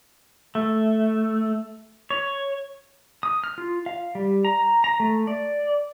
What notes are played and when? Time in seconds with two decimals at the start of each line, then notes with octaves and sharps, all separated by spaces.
0.55 A3
2.10 C#5
3.23 D#6
3.44 F6
3.58 F4
3.86 F5
4.15 G3
4.45 A#5
4.84 A#5
5.00 A3
5.27 D5